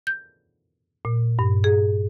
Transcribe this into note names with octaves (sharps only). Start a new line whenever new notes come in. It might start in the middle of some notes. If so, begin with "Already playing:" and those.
G6
A#2
G2
G#4